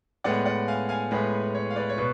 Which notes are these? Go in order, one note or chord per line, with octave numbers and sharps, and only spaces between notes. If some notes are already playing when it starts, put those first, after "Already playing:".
A2 G#3 B3 D5 F#5
D5 F#5
F5 G#5
F5 G#5
A2 G#3 B3 B4
C#5
F5
B4 D5
C#5
B2 B4